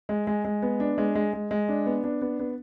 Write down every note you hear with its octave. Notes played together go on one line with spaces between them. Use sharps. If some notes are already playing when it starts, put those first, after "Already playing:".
G#3
G#3
G#3
B3
D4
G#3
G#3
G#3
G#3
D4
B3
D4
B3
B3